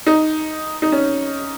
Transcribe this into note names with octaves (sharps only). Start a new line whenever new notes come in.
D#4
D#4
C#4